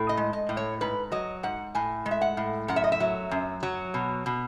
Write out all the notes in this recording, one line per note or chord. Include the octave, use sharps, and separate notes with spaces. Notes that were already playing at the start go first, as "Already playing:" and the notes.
Already playing: A2
D#5
G#3
D#5
A2
C#5
G#2 B4
F#3 D#5
G#2 F#5
A2 G#5
G#3
E5
F#5
A2
F#2 F#5
E5
D#5
E5
F#3
F#2
F#3
B2
B2